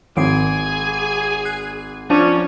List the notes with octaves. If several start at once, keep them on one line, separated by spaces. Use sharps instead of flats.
G#1 G#4 G#5 C7 D7
F#6 C7
F3 C#4 D4 D5 A5 C#6 D#7